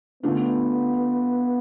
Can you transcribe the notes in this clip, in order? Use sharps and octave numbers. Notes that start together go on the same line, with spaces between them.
D3 A3 B3 D4 F4